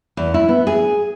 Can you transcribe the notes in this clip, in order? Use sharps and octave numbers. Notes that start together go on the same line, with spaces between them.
E2
E4
B3
G#4